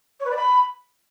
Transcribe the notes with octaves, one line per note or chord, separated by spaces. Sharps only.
C#5
B4
D5
B5